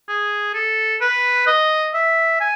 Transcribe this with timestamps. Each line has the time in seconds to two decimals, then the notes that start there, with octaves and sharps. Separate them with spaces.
0.09 G#4
0.54 A4
1.01 B4
1.47 D#5
1.94 E5
2.41 G#5